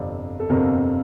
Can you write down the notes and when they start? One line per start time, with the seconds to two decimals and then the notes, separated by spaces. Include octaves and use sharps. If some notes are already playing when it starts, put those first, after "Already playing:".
Already playing: G1 F2 C3 D5
0.40 A4
0.49 G1 F2 C3 A#4